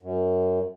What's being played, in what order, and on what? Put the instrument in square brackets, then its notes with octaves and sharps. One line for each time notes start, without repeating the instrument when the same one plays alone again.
[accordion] F#2